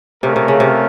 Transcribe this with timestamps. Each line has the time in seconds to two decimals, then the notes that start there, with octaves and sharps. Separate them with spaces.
0.23 C3 A3 C#4 F4 A#4
0.36 C3
0.48 C#3
0.60 C3